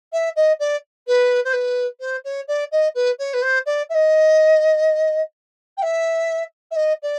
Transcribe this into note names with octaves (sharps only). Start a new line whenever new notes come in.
E5
D#5
D5
B4
C5
B4
C5
C#5
D5
D#5
B4
C#5
B4
C5
D5
E5
D#5
G5
E5
E5
D#5
D5